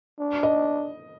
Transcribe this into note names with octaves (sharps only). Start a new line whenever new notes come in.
D4
D#5